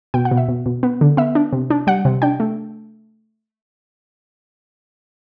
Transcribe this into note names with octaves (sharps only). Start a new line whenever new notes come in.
B2 G5
F#5
B2
E5
B2
B2
B3
D3
B3 E5
D4
C3
D4
G3 F#5
C3
D4 G5
A3